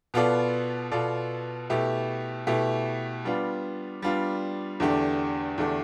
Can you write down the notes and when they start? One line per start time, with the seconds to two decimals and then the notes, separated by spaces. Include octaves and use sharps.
0.14 B2 B3 F4 A4 D5
0.91 B2 B3 F4 A4 D5
1.70 B2 A3 E4 G4
2.47 B2 A3 E4 G4
3.25 G3 B3 D4 F4
4.02 G3 B3 D4 F4
4.80 E2 D3 A3 D4 G4
5.58 E2 D3 A3 D4 G4